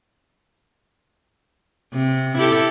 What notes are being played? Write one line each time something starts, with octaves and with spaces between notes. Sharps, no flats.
C3
E4 G4 A4